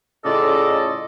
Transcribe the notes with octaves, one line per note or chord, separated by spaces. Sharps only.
A2 C#3 F4 A4 D5 D#5